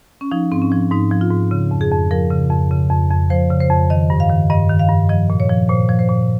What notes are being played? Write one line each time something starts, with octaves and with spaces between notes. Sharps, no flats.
C#4
F3 D#4
G#2 C4
C#4
F3
G#2 D#4
F3
F4
G#2
C#3
F2
G#4
F2
F3 A#4
C#3
F2
C#3
F2
F2
F3 C5
C#3
C5
F2
D#3 D#5
G2
F5
D#3
G2 D#5
D#3
F5
G2
F3 D#5
A#2
C#5
F3
A#2 C5
F3
C5
A#2